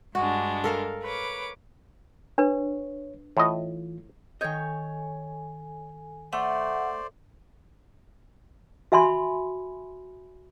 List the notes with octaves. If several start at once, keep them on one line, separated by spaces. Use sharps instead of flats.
G2 G#3 D4 F#4
A4 A#4 F5
B4 C#5 D6
D4 B4 C#5
A2 E3 F4 D#5
D#3 A4 C#5 D#5 G#5 G6
A3 C5 D5 F#5
F#4 E5 G#5 B5 C6